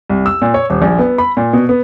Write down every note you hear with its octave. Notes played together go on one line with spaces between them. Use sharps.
C2
E6
A#2
C#5
D#1
A#1
B3
B5
A#2
B2
B3